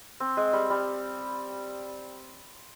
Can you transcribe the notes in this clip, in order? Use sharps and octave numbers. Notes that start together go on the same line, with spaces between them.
C4
G#3
G3
G3